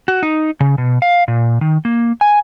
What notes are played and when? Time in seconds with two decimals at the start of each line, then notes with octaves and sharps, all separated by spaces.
0.08 F#4
0.23 D#4
0.60 C#3
0.78 B2
1.02 F5
1.28 A#2
1.61 D#3
1.85 A#3
2.21 G#5